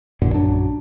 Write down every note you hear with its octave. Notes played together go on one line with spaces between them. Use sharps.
A1 F#2 A#2 D3
A#1 F#2 F#3 D4